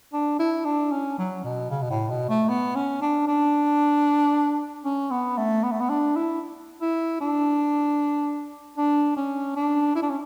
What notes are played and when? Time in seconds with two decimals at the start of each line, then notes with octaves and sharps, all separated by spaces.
0.13 D4
0.39 E4
0.65 D4
0.92 C#4
1.18 F#3
1.44 B2
1.70 C#3
1.82 B2
1.90 A2
2.10 B2
2.29 A3
2.49 B3
2.75 C#4
3.02 D4
3.27 D4
4.85 C#4
5.11 B3
5.37 A3
5.63 B3
5.72 A3
5.80 B3
5.89 D4
6.16 E4
6.81 E4
7.20 D4
8.77 D4
9.17 C#4
9.56 D4
9.95 E4
10.02 D4
10.10 C#4